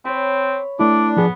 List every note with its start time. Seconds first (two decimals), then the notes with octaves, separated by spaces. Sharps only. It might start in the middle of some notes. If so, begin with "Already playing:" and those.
0.05 C4 C#5 B5
0.79 A3 D4 E4 B4 D5
1.17 F3 B3 G#4